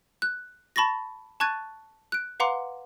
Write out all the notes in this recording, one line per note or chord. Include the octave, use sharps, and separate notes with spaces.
F#6
A5 B5 C#6 A6 A#6
A5 C#6 F#6 G#6 A6 D#7
F#6 D7
B4 F5 F#5 A#5 C6 D6